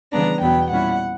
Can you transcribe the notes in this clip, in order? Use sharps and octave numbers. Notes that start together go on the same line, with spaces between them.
C#3 E3 G3 B3 D4 A#5
E2 B2 F#3 B3 G5
A#2 G3 C#4 E4 F#5